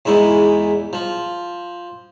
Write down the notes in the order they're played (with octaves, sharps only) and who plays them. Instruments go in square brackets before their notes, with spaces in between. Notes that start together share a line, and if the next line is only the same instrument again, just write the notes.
[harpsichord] E2 G#2 E4
F3